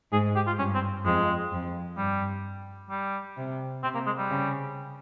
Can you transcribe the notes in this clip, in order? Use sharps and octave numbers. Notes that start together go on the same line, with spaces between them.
G#2 G#4
G4
F4
G2 C#4
C4
F2 G#3
F2
G2 G3
G3
C3
C3 C4
A#3
G#3
G3
C#3